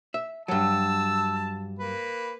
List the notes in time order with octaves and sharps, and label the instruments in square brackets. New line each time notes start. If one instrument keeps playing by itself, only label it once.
[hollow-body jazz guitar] E5
[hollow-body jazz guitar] G2 F#3 [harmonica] A5 E6
[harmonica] A#3 B4